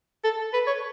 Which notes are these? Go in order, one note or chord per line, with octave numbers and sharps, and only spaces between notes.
A4
B4
C#5